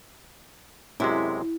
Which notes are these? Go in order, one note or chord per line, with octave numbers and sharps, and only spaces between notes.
F#2 C3 G#3 E4